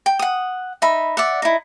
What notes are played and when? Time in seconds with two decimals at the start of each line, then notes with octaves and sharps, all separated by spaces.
0.06 G5
0.19 F#5 D#6
0.82 D#4 E5 B5
1.17 D5 E5 F#5
1.42 D#4 E4